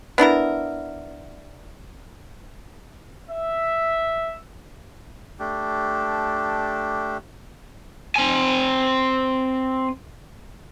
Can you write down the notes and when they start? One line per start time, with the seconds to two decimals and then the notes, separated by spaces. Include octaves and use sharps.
0.18 B3 D4 E4 A#4
3.30 E5
5.39 A3 D4 G4
8.16 C4 G#5